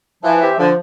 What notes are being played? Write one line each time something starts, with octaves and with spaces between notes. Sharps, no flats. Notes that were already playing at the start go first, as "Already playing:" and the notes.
E3 F3
C4 G4 C5 E5
D3 F3